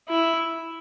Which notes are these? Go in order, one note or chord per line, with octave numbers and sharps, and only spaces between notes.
E4